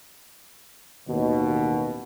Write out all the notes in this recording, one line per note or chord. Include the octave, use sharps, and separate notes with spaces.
A1 D#2 B2